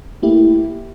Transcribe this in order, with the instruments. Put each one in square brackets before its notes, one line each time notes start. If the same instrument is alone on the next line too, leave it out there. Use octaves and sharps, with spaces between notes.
[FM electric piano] A3 A#3 E4 G4